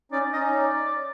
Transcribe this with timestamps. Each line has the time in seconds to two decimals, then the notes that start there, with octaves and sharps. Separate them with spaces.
0.12 C#4 D#4 D5
0.33 C#4 D#4 D#5
0.55 D5